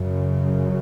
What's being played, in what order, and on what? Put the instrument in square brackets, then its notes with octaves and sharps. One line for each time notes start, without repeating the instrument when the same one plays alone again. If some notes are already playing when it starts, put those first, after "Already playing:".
Already playing: [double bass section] F#2 C#3